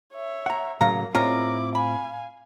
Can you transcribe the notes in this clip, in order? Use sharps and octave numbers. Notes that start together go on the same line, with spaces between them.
C#5 E5
F#5 A#5
A2 C#3 F#3 A#3 F5 A#5
A2 G#3 C4 C#4 E4 F4 A#4 D6
F5 G#5 B5